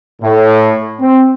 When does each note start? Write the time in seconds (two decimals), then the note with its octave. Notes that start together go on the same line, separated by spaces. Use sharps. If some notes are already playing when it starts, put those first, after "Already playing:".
0.22 A2
1.00 C4